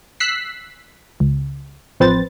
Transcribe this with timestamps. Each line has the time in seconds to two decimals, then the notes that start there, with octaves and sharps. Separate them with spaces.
0.20 E6 F#6 B6 C7
1.20 C#2
2.00 A1 F3 C4 B4 C5 A6